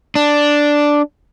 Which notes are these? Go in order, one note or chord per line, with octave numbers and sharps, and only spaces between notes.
D4